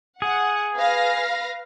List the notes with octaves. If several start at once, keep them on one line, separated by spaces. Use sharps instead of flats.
G#4 F#5
B4 F5 A#6